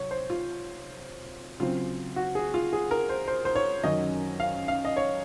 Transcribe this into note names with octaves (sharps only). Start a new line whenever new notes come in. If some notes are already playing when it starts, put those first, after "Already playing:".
Already playing: C3 F#3 C#5
C5
F4
C#3 F#3 C4 F4
F#4
G#4
F4
G#4
A#4
C5
C5
C5
C#5
F#2 D#3 F#3 C#4 D#5
F5
F5
D#5
C#5